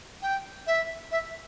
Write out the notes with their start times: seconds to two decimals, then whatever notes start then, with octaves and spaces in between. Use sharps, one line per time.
0.22 G5
0.67 E5
1.12 E5